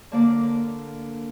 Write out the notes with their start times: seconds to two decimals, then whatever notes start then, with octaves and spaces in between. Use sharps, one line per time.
0.12 D3 A#3 D5